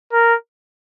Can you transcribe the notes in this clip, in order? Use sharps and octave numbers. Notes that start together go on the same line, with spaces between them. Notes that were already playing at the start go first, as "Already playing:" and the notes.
A#4